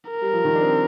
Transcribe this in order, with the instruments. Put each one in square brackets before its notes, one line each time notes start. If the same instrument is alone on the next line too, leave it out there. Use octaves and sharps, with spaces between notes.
[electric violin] A#4
[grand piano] G3
F3
D#3
D4
C4